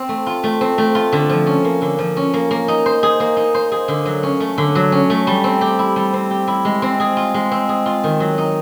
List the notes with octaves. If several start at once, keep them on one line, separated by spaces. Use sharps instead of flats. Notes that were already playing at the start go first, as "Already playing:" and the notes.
Already playing: C4
A3
F4
A3
C4
A3
F4
D3
F3
C#4
A#3
D3
F3
C#4
A#3
A#3
D#4
C5
G#4
A#3
D#4
C5
G#4
D3
F#3
C#4
A3
D3
F#3
C#4
A3
G3
C4
G4
E4
G3
C4
G4
E4
G#3
C4
G#4
F4
G#3
C4
G#4
F4
D#3
F#3
D#4